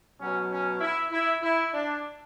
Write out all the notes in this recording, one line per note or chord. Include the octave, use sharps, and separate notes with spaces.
B2 F#3 C#4
C#4
E4
E4
E4
D4